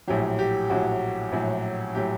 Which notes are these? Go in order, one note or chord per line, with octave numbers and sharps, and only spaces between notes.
A#1 A2 F#3 G4
G4
A#1 A2 F#3 F#4
A#1 A2 F#3
A2 F#3 G4